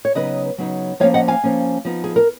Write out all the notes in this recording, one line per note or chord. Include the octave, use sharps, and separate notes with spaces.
C#5
C#3 F#3 B3 D#4 B4 D#5
C#3 F#3 B3 D#4
F3 A#3 C#4 C#5 F5
D#5 F#5
F5 G#5
F3 A#3 C#4
F3 B3 D#4
G#4
A#4